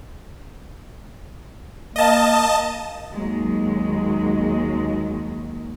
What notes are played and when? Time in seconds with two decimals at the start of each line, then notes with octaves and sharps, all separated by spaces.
1.96 A#3 D#5 A5
3.12 D#2 F#3 G#3